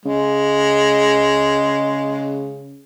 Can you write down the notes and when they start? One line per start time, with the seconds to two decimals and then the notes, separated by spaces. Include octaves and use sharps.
0.05 C#3 G#3